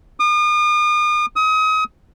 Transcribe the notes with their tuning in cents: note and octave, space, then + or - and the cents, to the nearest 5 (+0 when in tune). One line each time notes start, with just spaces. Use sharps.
D#6 -45
D#6 +30